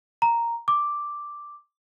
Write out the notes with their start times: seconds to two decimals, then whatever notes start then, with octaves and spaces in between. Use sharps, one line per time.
0.22 A#5
0.68 D6